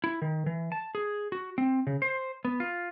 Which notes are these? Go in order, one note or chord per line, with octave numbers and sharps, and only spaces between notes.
E4
D#3
E3
A5
G#4
F#4
C4
C#3
C5
B3
F4